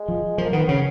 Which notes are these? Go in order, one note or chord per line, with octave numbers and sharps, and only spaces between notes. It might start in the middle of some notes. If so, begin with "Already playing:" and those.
Already playing: G#3
F3
F3 A#3
D#3 B3
C#3 C#4